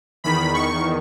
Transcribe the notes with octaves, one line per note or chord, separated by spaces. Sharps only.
E2 D#3 B5
C#6